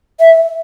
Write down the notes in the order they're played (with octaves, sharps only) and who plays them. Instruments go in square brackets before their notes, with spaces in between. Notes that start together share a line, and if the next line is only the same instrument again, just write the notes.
[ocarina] E5